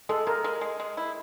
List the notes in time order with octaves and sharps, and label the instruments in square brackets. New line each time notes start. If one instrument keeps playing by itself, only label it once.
[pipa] G#3 [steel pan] A4
[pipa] G#3 [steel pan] A#4
[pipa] G#3
G#3
G#3
E4